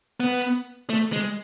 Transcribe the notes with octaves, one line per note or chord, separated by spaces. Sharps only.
B3
A3
G#3